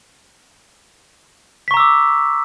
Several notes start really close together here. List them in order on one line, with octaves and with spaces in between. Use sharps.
B6 C#6 A#5 E6 D6